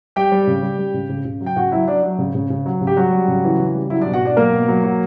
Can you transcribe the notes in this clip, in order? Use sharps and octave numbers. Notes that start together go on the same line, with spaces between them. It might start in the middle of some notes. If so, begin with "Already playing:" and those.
G3 G4 G5
G3
C#3
G3
G3
C#3
C#3
C#3
F#3
G5
C#3 F#4 F#5
F#3 E4 E5
F#3 D4 D5
F#3
C#3
C#3
C#3
F#3
C#3
G4
F#3 G3 F#4
G3
C#3
E3
C#3
G3
F#3 E4
D4 D5
B2
F#4 F#5
B2 D4 D5
F#3 A#3 A#4
B2
F#3
F#3